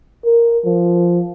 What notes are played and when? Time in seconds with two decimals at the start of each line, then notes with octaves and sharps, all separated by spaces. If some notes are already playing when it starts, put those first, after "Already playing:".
0.25 A#4
0.65 F3